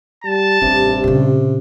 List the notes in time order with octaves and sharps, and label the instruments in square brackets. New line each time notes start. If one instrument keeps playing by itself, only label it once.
[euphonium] G3 [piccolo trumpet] A5
[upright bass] A1 [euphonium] G2 [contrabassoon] C3
[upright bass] A#2 C#3